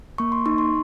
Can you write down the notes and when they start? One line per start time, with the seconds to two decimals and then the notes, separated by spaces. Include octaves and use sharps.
0.18 A#3 C#6
0.32 C6
0.46 D#4 C#6
0.58 C6